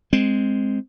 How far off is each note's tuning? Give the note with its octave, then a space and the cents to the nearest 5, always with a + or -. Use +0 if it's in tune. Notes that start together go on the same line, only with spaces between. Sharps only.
G#3 +0 C4 +0